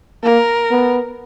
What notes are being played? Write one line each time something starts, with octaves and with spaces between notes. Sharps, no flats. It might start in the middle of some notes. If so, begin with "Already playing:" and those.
A#3 A#4
B3